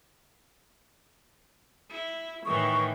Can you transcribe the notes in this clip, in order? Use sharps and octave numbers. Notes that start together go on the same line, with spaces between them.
E4
A2 D#3 E3 C#6